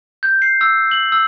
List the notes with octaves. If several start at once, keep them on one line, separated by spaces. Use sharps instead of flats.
G6
C7
E6
F#7
E6